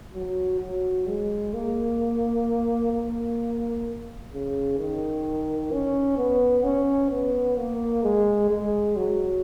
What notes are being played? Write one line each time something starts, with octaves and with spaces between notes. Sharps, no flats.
F#3
F#3
G#3
A#3
A#3
C#3
D#3
C#4
B3
C#4
B3
A#3
G#3
G#3
F#3